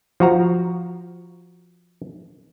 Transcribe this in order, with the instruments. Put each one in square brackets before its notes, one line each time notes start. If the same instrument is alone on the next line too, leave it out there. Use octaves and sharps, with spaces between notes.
[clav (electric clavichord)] F3 F#4 A#5